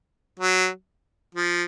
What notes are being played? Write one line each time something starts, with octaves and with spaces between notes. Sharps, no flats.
F#3
F3